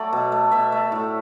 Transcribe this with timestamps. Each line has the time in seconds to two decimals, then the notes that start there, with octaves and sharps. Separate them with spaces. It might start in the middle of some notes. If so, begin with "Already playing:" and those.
Already playing: F#3 A3 D5
0.13 B2
0.32 A3
0.51 B2 E5
0.72 A3
0.92 A2